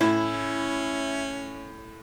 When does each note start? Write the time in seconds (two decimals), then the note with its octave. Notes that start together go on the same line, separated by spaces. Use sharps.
0.01 A2 C#4 E4